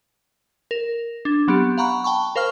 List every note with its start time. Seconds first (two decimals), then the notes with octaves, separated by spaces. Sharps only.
0.71 A#4
1.25 D4
1.48 F#3 B3 C4 G4
1.78 F5 F#5 A#5 B5 C#6 F#6
2.04 G5 A5 B5 C#6
2.36 A#4 C5 F5 C#6 F6